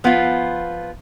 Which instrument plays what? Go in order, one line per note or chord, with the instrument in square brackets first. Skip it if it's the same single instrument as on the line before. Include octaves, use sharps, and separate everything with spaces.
[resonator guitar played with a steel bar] F3 B3 F4